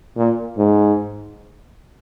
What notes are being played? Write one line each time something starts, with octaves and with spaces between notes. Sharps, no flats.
A#2
G#2